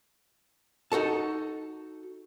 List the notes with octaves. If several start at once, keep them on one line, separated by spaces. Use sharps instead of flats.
D#4 F#4 A4 A5